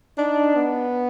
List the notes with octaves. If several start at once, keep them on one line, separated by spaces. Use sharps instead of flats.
D4 D#4
B3